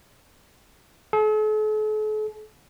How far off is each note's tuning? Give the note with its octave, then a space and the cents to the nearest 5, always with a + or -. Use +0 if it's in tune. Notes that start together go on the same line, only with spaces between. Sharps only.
A4 -45